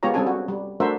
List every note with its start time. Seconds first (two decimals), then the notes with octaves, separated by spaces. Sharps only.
0.03 G#3 B3 F4 G4 C#5 A#5
0.14 G3 C4 C#4 G#4 A4 G#5
0.27 F#4
0.48 G3
0.80 A3 D4 F#4 A#4 C5 E5